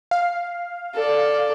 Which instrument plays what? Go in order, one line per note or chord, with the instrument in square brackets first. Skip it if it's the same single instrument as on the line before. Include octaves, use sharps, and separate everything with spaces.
[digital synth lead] F5
[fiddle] A4 D5